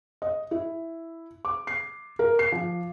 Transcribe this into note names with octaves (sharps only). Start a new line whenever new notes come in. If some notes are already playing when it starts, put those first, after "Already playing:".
D#5
E4
D6
C7
A#4
C7
F3